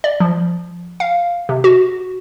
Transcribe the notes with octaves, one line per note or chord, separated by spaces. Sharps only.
D5
F3
F5
C3
F#4